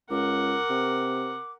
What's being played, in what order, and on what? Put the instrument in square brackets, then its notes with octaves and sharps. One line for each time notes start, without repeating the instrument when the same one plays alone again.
[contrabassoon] C#2 [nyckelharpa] A#4 F#5 [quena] D6
[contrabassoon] C3